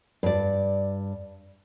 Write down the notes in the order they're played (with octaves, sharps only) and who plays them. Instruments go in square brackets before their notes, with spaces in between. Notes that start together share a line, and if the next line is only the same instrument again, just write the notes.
[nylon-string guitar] G2 D5